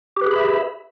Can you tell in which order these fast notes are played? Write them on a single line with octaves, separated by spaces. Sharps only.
G4 B4 G#4 B5 E5